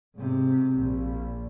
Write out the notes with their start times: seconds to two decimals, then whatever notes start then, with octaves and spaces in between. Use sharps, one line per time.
0.16 G#2 C3
0.77 A#1